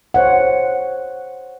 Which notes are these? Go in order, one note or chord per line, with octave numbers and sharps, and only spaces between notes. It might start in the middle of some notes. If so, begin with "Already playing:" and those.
C5 C#5 F#5